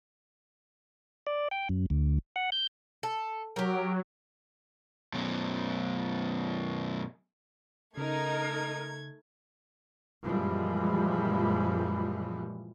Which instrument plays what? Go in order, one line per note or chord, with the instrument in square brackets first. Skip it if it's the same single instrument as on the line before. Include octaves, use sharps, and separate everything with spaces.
[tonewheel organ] D5
G5
F#2
D2
F#5
G6
[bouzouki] A4
[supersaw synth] F#3 [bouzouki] G4 A#4
[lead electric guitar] F#2 B2
[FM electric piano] C#3 [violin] A3 G#6 [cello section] D#4 [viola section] A#4
[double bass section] F#2 A#2 E3 F3 G3 G#3